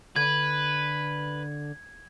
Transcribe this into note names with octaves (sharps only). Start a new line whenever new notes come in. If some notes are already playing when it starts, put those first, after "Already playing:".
D3 B4 G#6